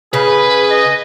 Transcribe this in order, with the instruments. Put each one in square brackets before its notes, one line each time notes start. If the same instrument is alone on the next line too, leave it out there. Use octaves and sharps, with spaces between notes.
[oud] C#3 [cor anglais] G#4 [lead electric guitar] B4
[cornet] D#5